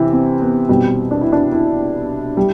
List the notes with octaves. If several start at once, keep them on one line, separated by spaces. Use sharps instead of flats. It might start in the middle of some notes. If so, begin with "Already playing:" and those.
Already playing: C3 E3 E4
C4
B3
B2 G3 C4
D4
E4
D4
E4
G3